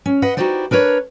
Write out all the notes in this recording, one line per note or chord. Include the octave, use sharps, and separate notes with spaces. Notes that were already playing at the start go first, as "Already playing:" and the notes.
C#4
B4 D#5 F#5
D#4 E4 F#4 G4 C5 D5
D4 A#4 B4 C#5